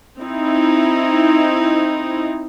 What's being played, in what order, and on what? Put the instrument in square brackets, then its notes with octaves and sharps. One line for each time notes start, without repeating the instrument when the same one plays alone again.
[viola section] C4 D#4 E4